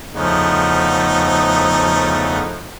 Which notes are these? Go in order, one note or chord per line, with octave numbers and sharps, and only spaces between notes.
E2 C#3 F3 A3 B3 D#4